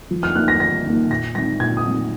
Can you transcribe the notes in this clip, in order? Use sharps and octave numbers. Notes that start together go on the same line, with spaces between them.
F3
F6
A#3 D#4 F#6
A#6
F3 A#6
A#3 D#4
A#2 A#6
G#3 C4 D#4 A#6
A#2 G#6
D#6
G#3 C4 D#4